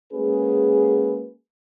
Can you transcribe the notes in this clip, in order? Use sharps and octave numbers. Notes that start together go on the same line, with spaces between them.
G#3 A#3 C#4 F#4 G#4 B4